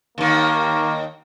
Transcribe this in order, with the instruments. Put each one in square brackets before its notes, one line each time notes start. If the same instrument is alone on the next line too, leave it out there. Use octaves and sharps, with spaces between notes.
[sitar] D#2 D#3 [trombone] A#3